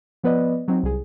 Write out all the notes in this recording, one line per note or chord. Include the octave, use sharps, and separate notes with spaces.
F3 B3 B4 D5 D#5
F#3 C4 D#4
C2 G#4